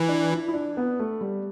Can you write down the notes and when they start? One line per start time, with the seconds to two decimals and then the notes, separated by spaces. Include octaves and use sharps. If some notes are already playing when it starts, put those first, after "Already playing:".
Already playing: E3
0.09 D4
0.32 E4
0.48 E4
0.54 D4
0.77 B3
0.99 A3
1.21 G3